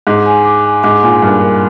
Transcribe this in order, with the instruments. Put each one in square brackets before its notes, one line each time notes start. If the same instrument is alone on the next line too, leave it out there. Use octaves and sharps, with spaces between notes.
[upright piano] G#2 [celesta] D6
[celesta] G#5
D6
G#5
[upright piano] G#2 [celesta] D6
[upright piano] A#2 [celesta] G#5
[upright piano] G2 [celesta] A#4
[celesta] A#4